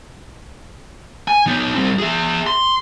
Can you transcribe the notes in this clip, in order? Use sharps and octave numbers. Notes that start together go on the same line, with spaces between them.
G#5
B3 D#4
G3 C4
G#4 E5
C6